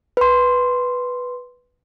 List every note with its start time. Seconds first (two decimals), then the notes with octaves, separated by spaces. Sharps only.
0.17 B4 C6